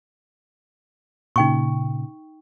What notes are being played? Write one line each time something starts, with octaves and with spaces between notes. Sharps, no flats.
A#2 C#3 D#4 G5 C#6